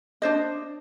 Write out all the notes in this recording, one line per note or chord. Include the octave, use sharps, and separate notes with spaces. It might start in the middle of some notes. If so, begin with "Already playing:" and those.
D4 C5 D#5